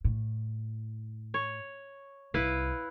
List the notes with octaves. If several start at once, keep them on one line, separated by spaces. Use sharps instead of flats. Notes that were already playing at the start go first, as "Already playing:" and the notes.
A2
C#5
C2 E4 B4 F5